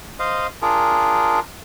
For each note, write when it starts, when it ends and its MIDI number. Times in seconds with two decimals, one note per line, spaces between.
0.19 0.47 72
0.19 0.47 75
0.19 0.47 77
0.62 1.40 62
0.62 1.40 65
0.62 1.40 68
0.62 1.40 70